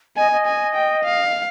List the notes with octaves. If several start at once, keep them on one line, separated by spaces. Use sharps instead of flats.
D#5 G#5
D#5
G#5
G5
F5